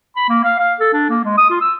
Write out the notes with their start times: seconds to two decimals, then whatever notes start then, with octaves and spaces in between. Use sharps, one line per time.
0.16 B5
0.29 A#3
0.44 F5
0.59 F5
0.80 A4
0.93 D4
1.09 A#3
1.25 G#3
1.38 D#6
1.50 F4
1.61 E6